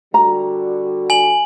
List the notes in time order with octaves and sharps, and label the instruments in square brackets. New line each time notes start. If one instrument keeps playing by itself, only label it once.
[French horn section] D3 G3 F#4 [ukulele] A#5
[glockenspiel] G#5 F#7